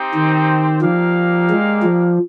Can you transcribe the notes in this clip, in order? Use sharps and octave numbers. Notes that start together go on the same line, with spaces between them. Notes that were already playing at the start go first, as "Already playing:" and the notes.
Already playing: C4 D#4 G4 C5 G5
D#3
F3 A#3 D#4 G4 D5 F5
G#3
F3